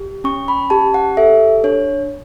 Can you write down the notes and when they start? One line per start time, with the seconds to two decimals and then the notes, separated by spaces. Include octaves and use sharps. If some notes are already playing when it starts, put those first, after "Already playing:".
Already playing: G4
0.24 C#4 C#6
0.48 B5
0.70 G4 A5
0.94 F#5
1.17 A4 E5
1.64 D4 C#5